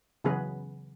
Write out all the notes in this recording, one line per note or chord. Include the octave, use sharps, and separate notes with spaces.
C#3 E3 F#3 B3 G#4 B4